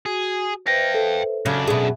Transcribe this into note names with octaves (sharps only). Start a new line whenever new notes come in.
F#4 G#4
B4 C5 E5 F5 G5 A#6
A4
F#2 C#3 D4
B2 G#4 E5